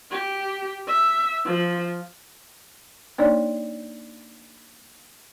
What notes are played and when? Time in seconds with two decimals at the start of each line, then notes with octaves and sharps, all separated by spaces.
0.11 G4
0.87 E5
1.45 F3
3.18 A#3 D4 D#4 C#5 D5